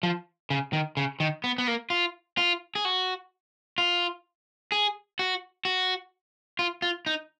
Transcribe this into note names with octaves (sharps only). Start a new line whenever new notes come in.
F3
C#3
D#3
C#3
D#3
B3
B3
A#3
F4
F4
G#4
F#4
F4
G#4
F#4
F#4
F4
F4
D#4